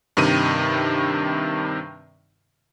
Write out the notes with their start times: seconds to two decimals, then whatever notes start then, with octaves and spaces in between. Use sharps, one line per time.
0.17 G2 C3 D#3 D#7